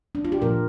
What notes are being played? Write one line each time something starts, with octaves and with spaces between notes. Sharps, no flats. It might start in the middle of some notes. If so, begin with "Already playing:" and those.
D4
F4
G4
A#2 F3 A#3 A#4